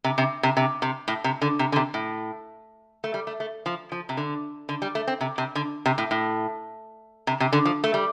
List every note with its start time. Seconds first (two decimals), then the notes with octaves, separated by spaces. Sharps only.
0.04 C3
0.18 C3
0.43 C3
0.57 C3
0.82 C3
1.08 A2
1.24 C3
1.42 D3
1.59 C3
1.72 D3
1.76 C3
1.94 A2
3.04 A3
3.14 G3
3.27 A3
3.40 A3
3.66 F3
3.92 F3
4.09 C3
4.17 D3
4.69 D3
4.82 G3
4.95 A3
5.07 C4
5.21 C3
5.38 C3
5.55 D3
5.86 C3
5.98 A2
6.11 A2
7.27 C3
7.40 C3
7.53 D3
7.65 F3
7.84 A3
7.94 G3